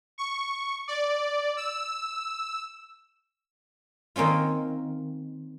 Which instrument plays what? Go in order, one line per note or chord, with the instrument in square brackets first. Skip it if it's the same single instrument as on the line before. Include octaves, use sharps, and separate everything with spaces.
[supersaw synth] C#6
D5
E6
[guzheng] D#3 A#3 C4 C#4 F4